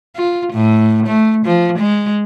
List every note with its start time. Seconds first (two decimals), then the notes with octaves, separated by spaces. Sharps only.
0.16 F4
0.53 A2
1.07 A3
1.46 F3
1.79 G#3